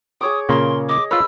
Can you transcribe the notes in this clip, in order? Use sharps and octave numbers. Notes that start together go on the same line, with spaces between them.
G#4 C#5 D6 D#6
A#2 C#3 A#3 C6
D#5 D6
F4 A#4 B4 C#5 E6